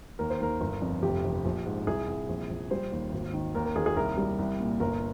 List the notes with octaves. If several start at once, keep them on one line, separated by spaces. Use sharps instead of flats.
D#2 A#4
C5
D#2 A#4
G1
F2
F1 G4
F1
A#1
G#2
C2 G#4
C2
A#1
A#1
G3 C5
D#2
G#1
D#3
D#2 A#4
A#4
D#2 G#4
G#4
C2 A#4
G3
C2
A#2
G1 A#4